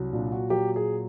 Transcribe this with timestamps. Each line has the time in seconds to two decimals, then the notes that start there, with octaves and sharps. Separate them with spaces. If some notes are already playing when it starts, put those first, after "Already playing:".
Already playing: C2 F#3
0.13 A#2 D4
0.32 F#4
0.50 F#3 G4
0.76 G#4